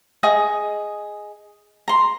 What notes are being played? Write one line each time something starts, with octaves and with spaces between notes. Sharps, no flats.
G#4 D#5 C#6 D#6
A#5 C6